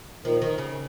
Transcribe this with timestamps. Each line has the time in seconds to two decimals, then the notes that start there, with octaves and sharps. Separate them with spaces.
0.25 A#2 D#3 F3
0.42 D#3
0.58 C#3